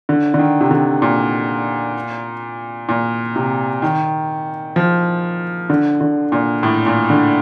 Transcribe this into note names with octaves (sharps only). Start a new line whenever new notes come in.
D3
D3
D#3
C3
D3
A#2
A#2
C3
D#3
F3
D3
D3
A#2
A2
A#2
D3